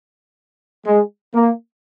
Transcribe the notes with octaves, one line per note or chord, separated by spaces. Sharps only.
G#3
A#3